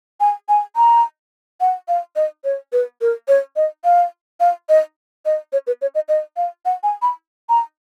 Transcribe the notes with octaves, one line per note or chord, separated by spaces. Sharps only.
G#5
G#5
A#5
F#5
F5
D#5
C#5
B4
A#4
C#5
D#5
F5
F5
D#5
D#5
C#5
B4
C#5
D#5
D#5
F5
F#5
G#5
B5
A#5